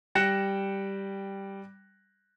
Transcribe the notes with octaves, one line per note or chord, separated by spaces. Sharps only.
G3 G5 F#6 A#6 C#7 E7